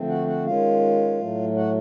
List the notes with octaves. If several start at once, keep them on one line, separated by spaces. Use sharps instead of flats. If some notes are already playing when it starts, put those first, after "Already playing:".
Already playing: D3 F3 A3 C4
F#4 F#5
F#4 F#5
D#3 G#3 C#4 F4 F5
A2 F#3 A3
F#4 F#5